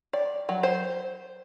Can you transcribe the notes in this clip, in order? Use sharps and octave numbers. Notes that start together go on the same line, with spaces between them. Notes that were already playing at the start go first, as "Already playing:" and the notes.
D5
F#3
C5